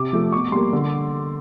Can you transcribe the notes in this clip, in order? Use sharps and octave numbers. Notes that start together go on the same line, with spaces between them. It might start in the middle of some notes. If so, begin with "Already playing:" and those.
Already playing: C3 D6
F3 A3
B2 C#6
G3 A#3 C6
D3